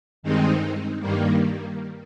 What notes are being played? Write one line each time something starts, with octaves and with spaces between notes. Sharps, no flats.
G2 D#3 G#3 C4 D#4
G2 D#3 G3 A#3